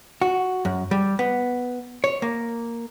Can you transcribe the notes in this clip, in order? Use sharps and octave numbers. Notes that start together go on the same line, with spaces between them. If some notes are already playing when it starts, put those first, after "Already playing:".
F#4
F#2
G3
B3
C#5
A#3